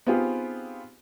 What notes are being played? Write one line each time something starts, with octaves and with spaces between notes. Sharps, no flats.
B3 C4 D#4 F4 G4 G#4